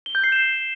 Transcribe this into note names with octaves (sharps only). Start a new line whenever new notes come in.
G7
G6
C7
E7